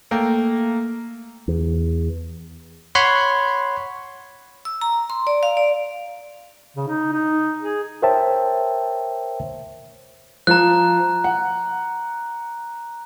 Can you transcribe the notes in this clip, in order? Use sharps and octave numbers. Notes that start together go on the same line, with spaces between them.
A3 A#3 G5
E2
C#5 F#5 B5 C6
E6
A#5
C6
D5
F5
D5
C#3
D#4
D#4
G#4
A#4 C5 C#5 E5 G5 A5
F3 A#5 F#6
F#5